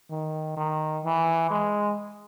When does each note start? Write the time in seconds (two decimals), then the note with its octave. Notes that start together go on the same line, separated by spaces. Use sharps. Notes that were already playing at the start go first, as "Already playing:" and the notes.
0.10 D#3
0.57 D#3
1.04 E3
1.50 G#3